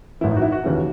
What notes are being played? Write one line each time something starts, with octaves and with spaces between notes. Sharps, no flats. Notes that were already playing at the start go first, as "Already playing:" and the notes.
A1 A2 E3 E4
D#4
F#4
E4
F#4
D#2 C#3 E3